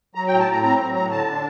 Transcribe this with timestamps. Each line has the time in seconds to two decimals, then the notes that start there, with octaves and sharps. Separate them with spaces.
0.15 F#3 A#5
0.27 G5
0.31 A2 A#5
0.39 A5
0.47 A2 A#5
0.63 C4 A#5
0.79 F#3
0.95 A2 A#5
1.11 D3 A5
1.28 D4